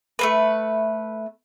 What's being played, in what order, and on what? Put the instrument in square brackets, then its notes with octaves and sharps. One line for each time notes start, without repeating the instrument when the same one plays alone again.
[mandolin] A3 A#3 B4